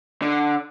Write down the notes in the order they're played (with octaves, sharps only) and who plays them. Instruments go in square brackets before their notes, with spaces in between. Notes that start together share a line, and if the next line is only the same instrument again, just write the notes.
[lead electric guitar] D3